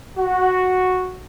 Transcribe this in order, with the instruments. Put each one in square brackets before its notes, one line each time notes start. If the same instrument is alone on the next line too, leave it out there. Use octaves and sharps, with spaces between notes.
[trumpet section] F#4